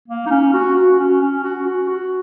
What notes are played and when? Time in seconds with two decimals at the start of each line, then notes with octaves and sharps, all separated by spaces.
0.08 A#3
0.26 D#4
0.31 C#4
0.53 F#4
0.76 F#4
0.99 C#4
1.21 C#4
1.44 F#4
1.66 F#4
1.89 F#4